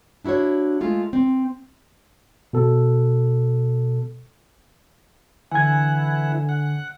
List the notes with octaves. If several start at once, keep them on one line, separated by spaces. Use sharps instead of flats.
D4 E4 F#4 C5 C#5
G#3 A3 F4
C4
B2 A4
D3 E3 E4 F#5 G#5 G#6
F#5